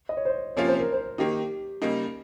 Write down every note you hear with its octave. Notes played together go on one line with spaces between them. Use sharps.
D#5
C#5
C5
C3 F3 A#3 C#4 F4 C#5
C5
A#4
C5
D#3 A#3 D#4 G4
C#3 G3 A#3 D#4